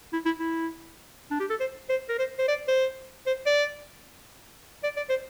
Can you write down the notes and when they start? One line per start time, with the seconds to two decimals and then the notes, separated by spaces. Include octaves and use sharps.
0.13 E4
0.25 E4
0.39 E4
1.31 D4
1.40 G4
1.50 A4
1.60 C5
1.90 C5
2.09 A#4
2.19 C5
2.39 C5
2.48 D5
2.68 C5
3.26 C5
3.46 D5
4.83 D5
4.97 D5
5.09 C5